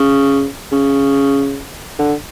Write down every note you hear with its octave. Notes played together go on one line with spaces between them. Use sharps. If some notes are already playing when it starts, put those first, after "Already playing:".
Already playing: C#3
C#3
D3